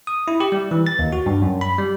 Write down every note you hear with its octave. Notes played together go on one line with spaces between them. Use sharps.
D#6
E4
G4
G3
E3
A6
D#2
F#4
G2
F#2
B5
G3